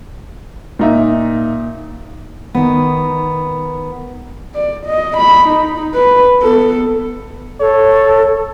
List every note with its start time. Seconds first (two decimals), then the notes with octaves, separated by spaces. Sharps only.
0.79 A#2 D#4 E5
2.55 D#3 B3
4.54 D5
4.86 D#5
5.17 B5
5.49 D#4
5.95 B4
6.41 B3 A4
7.60 A4 C#5